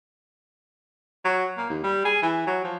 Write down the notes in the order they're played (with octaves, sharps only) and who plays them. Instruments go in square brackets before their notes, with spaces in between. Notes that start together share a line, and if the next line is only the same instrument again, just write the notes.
[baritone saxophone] F#3
A#3
D#2
G3
G#4
E3
F#3
F3